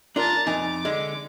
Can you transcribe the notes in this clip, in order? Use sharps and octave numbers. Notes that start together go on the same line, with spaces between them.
D4 F4 A#4 A5 A#5
F2 D#4 G#5 D6
D3 G#3